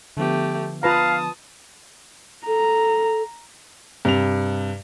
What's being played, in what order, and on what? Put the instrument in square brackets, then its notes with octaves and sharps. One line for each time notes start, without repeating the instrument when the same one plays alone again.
[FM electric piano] D3 F3 B3 [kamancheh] A3 G4
[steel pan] F4 B4 A#5 [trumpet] F5 [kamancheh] A5 D#6
[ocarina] A4 [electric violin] A#5
[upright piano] G2 C3 F7